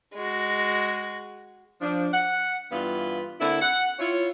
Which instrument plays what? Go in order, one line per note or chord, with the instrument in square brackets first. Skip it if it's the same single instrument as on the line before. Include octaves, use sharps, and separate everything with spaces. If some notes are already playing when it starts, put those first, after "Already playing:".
[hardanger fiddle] G#3 F#4
[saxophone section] F3 D4
F#5
G2 E3 B3 F4 B4 F5
D3 A#3 C4 E4
F#5
E4 F4 C#5